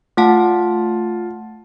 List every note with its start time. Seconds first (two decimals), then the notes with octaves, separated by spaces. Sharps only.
0.17 A3 F4 F#5 A5